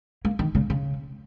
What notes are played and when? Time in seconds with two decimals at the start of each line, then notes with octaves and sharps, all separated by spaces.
0.25 A#3
0.39 D#3
0.55 C#3
0.70 C#3